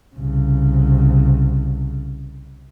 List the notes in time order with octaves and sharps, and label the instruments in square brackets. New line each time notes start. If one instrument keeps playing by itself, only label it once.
[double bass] C2 C#3